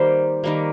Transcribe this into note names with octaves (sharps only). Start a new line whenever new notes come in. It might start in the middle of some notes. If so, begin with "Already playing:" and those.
Already playing: D#3 G3 A#3 C5
D#3 G3 A#3